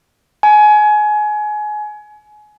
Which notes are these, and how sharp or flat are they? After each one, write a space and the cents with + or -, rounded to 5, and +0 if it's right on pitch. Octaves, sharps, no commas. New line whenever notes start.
G#5 +25